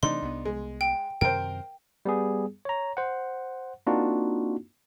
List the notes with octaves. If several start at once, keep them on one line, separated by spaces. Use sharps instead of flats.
C3 E3 A3 D4 D#4 C6
C2 B3
G#3
G5
F#2 C3 D#3 A#4 C5 G5
G3 B3 G#4
C#5 A#5
C5 F#5
A#3 C4 D4 D#4 F4 F#4